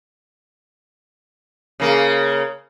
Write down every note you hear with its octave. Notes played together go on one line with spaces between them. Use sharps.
C#3 A#3